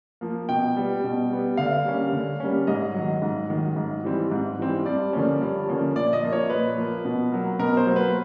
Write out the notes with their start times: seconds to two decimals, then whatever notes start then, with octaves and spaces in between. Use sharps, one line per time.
0.21 F3 A#3
0.49 B2 G5
0.77 G3 B3
1.04 B2
1.30 G3 B3
1.57 D3 F5
1.85 G3 A#3 C#4
2.13 D3
2.40 G3 A#3 C#4
2.67 G#2 D#5
2.94 D#3 F#3
3.22 G#2
3.50 D#3 F#3
3.76 G#2
4.04 E3 G3 C4
4.31 G#2
4.59 E3 G3 C4
4.85 G2 D5
5.13 D3 F3 A#3 C#4
5.41 G2
5.69 D3 F3 A#3 C#4
5.96 A#2 D5
6.13 D#5
6.23 F3 A#3
6.32 C#5
6.50 A#2 B4
6.77 F3 A#3
7.05 B2
7.32 F#3 A#3
7.59 B2 A#4
7.77 C5
7.86 F#3 A#3
7.96 B4